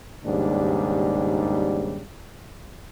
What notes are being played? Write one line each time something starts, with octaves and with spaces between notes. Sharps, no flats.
D#2 G#2 C#3 G3 D4